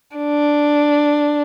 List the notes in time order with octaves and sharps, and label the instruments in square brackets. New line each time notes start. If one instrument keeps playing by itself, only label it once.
[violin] D4